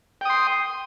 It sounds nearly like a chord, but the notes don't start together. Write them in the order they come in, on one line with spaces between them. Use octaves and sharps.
G5 D#6 C6